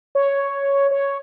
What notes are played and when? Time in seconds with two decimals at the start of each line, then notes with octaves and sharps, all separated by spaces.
0.15 C#5
0.91 C#5